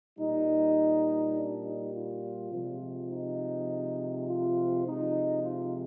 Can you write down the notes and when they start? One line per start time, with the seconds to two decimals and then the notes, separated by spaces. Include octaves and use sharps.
0.19 A#2 G3 D#4
1.36 D4
1.65 D#4
1.93 F4
2.52 C3 F3 G#3
3.11 D#4
4.27 F4
4.86 C3 F3 G#3 D#4
5.43 F4